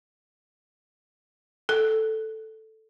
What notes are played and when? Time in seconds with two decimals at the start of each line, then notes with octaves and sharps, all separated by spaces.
1.69 A4